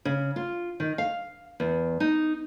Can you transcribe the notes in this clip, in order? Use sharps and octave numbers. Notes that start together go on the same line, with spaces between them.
C#3
F4
D#3
F5
E2
D#4